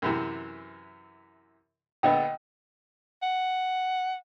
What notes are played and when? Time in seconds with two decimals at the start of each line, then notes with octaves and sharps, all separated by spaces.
0.02 F#2 C3 E3
2.03 A#1 D3 B3 D#5 G5
3.23 F#5